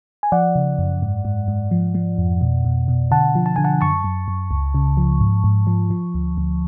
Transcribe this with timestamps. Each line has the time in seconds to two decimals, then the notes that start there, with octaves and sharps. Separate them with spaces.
0.23 G#5
0.32 F3 D5 F#5
0.55 C#3
0.79 F#2
1.02 G#2
1.25 G#2
1.48 G#2
1.71 F3
1.95 F3
2.18 F2
2.41 B2
2.65 B2
2.88 B2
3.11 D3 F#5 A5
3.35 F3
3.46 A5
3.56 D3 G#5
3.64 F#5 A5
3.81 F#2 A5 C#6
4.04 F#2
4.28 F#2
4.51 C#2
4.75 C#3
4.97 F3
5.20 G#2
5.44 G#2
5.67 F3
5.90 F3
6.15 D2
6.38 D2